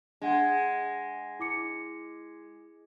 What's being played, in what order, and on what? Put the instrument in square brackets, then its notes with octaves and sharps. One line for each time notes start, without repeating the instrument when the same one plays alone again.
[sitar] G#3 [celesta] D4 F#5 G#6
[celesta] E4 D6 C#7